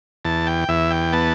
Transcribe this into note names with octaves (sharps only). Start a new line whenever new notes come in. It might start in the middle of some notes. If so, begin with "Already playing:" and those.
E2 A5
G5
E2 E5
G5
B3 A5